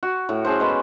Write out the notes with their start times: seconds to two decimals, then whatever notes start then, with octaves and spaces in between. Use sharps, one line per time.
0.03 F#4
0.29 A2
0.45 C#4 G#4 A4 C5
0.60 G#3 B3 B5